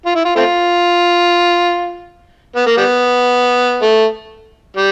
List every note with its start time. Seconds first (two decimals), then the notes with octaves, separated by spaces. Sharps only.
0.06 F4
0.15 E4
0.25 F4
0.36 A3 C4 F4
2.56 B3
2.67 A#3
2.77 G3 B3
3.82 A3
4.77 G3